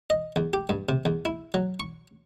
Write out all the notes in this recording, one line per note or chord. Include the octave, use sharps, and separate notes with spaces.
D#5
E2
G4
G2
C3
E2
E4
F#3
C#6